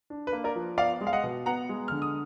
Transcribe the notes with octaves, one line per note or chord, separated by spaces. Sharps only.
D4
B4
A#3
A#4 D5
F3
B3 D5 F5
G#3
F5
D#5 F#5
B2
B3 F#5 A#5
G#3
D3 F6
D#6